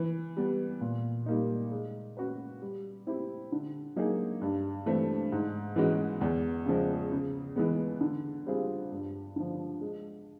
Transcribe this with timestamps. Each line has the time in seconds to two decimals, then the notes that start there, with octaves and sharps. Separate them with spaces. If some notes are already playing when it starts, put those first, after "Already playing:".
Already playing: E3
0.37 G3 B3
0.81 A#2
1.26 G3 A#3 D#4
1.72 G#3
2.17 C#4 F#4 B4
2.62 G3
3.07 C4 E4 G4
3.52 D3
3.96 F#3 A#3 D#4 G#4
4.41 G2
4.86 E3 A3 C4
5.32 G#2
5.76 E3 G#3 C#4 F#4
6.21 E2
6.66 C#3 F3 G#3
7.12 C#3
7.56 E3 G#3 B3
8.01 D3
8.46 G3 C4 F4 G#4
8.92 G2
9.36 D3 F3
9.81 G#3